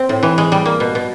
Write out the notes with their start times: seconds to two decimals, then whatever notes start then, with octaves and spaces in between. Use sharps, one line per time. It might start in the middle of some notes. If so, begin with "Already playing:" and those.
Already playing: C4
0.09 A2
0.23 E3
0.38 G#3
0.52 G3
0.66 A#3
0.80 B2
0.95 B2